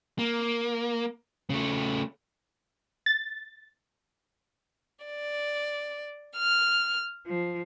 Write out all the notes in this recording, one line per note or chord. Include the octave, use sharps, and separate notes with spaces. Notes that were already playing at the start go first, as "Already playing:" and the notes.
A#3
C#3 A3
A6
D5
F6
F3